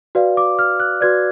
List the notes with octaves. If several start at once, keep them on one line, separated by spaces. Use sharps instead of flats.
F#4 B4 D5 F5
D6
F6
F#6
F#4 B4 D5 G#6